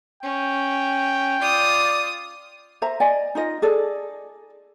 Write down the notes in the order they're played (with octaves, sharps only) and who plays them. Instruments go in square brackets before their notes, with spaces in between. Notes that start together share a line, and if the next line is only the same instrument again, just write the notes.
[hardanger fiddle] C#4 [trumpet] G5
[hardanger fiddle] F4 D#6 [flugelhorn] D5
[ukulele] C5 E5 A#5
D5 D#5 G#5
D#4 F4 D#5
G#4 A4 D5